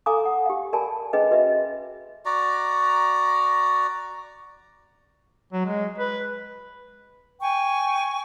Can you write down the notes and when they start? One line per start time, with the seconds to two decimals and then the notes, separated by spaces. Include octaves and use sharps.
0.06 A4 F5 G#5 A#5 D6 D#6
0.25 F#5
0.46 G4 F5
0.73 A#4 D5 G#5 A5 B5
1.13 C#4 G#4 B4 D#5
1.31 F#4 B4 D#5 E5
2.26 F#4 D5 A#5
5.53 F#3
5.66 G#3
5.98 B4
7.40 G5 G#5 C#6